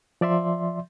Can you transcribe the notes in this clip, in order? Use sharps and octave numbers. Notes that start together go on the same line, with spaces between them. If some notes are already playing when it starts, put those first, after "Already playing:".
F3 D5 E5 C6